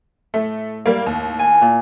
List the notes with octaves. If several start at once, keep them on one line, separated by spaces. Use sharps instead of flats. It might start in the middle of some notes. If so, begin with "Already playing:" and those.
A2 A3
G3 A#3
D#2
G#5
A#2